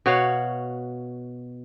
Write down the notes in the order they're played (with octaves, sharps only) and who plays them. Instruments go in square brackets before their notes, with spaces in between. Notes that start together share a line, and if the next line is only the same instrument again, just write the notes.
[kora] B2 F#4 C#5 F5